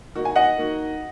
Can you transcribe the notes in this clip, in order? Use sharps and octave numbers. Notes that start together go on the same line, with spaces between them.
D#3 A#3 D#4 F#4
G#5
D#5 F#5
D#3 A#3 D#4 F#4